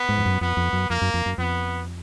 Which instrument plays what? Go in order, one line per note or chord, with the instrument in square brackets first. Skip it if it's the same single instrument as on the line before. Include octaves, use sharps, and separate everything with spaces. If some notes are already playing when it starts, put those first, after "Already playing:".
Already playing: [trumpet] B3
[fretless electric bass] G#2
F2
F#2
[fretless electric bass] F2 [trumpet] B3
[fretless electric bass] F2
F#2
[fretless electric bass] F2 [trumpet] A#3
[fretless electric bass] F#2
F2
F#2
[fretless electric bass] F2 [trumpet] B3